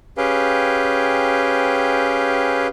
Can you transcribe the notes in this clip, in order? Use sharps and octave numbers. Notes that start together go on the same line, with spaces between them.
C#4 G4 G#4 B4 F5 G5